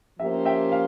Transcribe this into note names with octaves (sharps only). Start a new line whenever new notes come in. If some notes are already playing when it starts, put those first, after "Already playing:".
F3 A#3 C#4 G4 C5 E5
E5 G5
F5